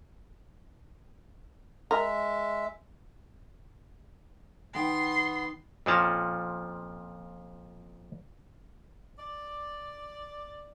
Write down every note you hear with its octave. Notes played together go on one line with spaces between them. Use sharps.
G#3 A#4 E5
D#3 B3 G5 C6
F2 A#2 F3 C#4 A5 A#5
D5